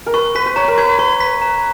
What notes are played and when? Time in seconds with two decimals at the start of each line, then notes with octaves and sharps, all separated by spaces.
0.06 A#4
0.14 B4 C#6
0.35 B4 B6
0.46 B4
0.56 C#5 A#5
0.68 A#4
0.78 B4 G#6
0.98 B4 C#6
1.20 B6
1.42 A#5